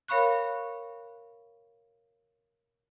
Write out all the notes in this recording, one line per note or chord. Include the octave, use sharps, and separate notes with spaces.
A#4 C#5 F5 B5 C#6 F#6